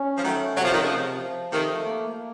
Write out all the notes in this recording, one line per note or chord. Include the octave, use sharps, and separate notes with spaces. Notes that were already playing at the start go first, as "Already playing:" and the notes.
Already playing: C#4
F3
D#3 F#3 A3
C3 F#3
F3
D#3
C#3 F3
C3
F3
C3 D#3 A3
A#3
A#3